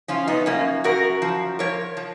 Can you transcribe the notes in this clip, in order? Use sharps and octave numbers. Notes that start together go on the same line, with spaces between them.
F3 C#4 F4
B3 D#4
F#2 A#3 C#4
F#2 F#4 A#4
F3
F3 A#4 C#5
F3